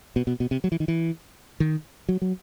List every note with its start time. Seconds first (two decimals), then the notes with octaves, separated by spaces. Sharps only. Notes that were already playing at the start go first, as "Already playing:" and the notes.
0.16 B2
0.27 B2
0.40 B2
0.51 C3
0.64 F#3
0.72 E3
0.80 D#3
0.88 E3
1.60 D#3
2.09 F#3
2.22 F#3